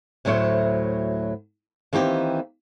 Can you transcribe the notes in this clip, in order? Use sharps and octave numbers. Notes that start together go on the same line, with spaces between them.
D2 A2 F#3 C5 C#5 E5
D#3 E3 A#3 C4 G4